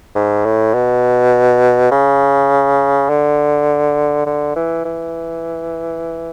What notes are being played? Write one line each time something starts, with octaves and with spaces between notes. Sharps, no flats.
G#2
A2
B2
C#3
D3
D3
E3
E3